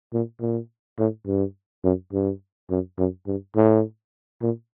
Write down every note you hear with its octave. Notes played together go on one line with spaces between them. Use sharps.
A#2
A#2
A2
G2
F#2
G2
F#2
F#2
G2
A2
A#2